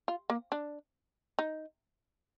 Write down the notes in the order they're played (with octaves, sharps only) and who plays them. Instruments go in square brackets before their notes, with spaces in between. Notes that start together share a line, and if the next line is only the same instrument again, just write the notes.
[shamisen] F4
A#3
D4
D#4